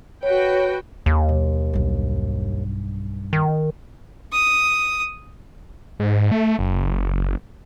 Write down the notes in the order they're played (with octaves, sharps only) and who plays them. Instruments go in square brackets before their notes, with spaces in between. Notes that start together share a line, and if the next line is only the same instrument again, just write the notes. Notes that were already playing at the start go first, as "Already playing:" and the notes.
[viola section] F#4 B4 G5 [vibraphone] C#5
[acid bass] D#2 [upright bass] D3 G#3
[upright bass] B1
B1 G2
[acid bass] D#3
[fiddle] D#6
[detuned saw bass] G#2
A3
F#1